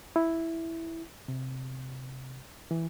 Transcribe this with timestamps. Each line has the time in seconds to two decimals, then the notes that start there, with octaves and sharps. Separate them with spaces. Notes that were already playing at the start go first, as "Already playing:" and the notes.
0.16 E4
1.28 C3
2.71 E3